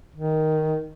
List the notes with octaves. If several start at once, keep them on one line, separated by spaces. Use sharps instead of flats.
D#3